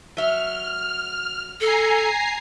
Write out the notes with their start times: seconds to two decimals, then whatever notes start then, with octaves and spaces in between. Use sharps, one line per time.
0.17 F#3 E5 F6
1.61 A4 G#5 A#5 C7